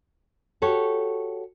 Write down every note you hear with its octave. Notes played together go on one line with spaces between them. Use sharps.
F#4 G4 A4 C#5